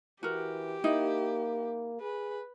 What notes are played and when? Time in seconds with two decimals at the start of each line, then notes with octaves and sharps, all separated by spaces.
0.23 E3 F#4 G4 A#4
0.84 A#3 D#4 E4
2.01 G#4 B4